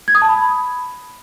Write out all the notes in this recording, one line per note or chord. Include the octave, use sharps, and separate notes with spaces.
G#6
D#6
A5
B5